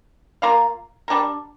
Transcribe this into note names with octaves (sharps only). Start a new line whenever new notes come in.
A#3 F4 A#4 F5
G3 D4 G4 A#4